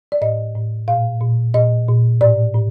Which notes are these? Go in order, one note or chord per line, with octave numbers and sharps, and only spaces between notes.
D5
A2 D#5
A2
A#2 F5
A#2
A#2 D#5
A#2
A2 D5
A2